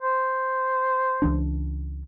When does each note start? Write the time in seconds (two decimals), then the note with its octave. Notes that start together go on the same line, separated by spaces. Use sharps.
0.02 C5
1.22 C#2 E3 D4